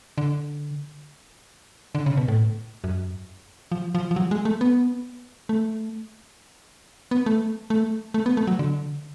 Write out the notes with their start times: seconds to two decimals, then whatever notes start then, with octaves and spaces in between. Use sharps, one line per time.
0.18 D3
1.95 D3
2.06 C#3
2.17 B2
2.28 A2
2.84 F#2
3.72 F3
3.95 F3
4.11 F3
4.16 F#3
4.31 G#3
4.45 A3
4.61 B3
5.49 A3
7.11 B3
7.26 A3
7.70 A3
8.14 A3
8.26 B3
8.37 A3
8.47 F#3
8.59 D3